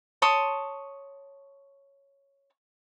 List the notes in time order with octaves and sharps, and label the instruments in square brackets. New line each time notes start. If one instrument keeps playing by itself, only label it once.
[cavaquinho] C#5 A5 C6 D#6